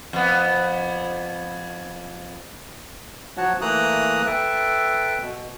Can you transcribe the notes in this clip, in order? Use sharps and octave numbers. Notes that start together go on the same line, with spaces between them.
F2 B3
F3 F#3 F#4 C#5 F#5 A5
E3 A3 A#3 A#5 D#6 F#6
A4 B4 E5 G5 A5
B2